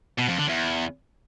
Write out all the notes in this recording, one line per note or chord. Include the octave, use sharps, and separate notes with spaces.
B2
F2
D3
E2